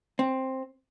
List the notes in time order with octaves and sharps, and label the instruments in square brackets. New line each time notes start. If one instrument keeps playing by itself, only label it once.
[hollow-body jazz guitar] C4